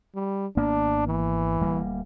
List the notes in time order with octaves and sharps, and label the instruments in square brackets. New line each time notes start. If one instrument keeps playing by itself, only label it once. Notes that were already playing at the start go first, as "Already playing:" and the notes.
[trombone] G3
[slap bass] G#1 A#3 B3 [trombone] D4
[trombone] E3
[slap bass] D1 G3 A#3